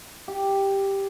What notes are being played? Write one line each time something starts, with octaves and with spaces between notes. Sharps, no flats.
G4